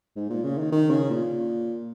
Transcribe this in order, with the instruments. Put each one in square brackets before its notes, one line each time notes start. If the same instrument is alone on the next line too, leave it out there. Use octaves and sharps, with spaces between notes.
[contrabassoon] G#2
A#2
C#3
D#3
D#3
C#3
A#2